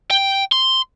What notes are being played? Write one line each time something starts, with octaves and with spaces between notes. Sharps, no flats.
G5
C6